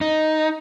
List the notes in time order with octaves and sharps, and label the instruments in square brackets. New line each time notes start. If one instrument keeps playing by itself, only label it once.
[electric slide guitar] D#4